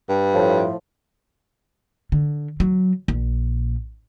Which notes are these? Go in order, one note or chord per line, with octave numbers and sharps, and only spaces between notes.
G2
A2 F3
D3
F#3
A#1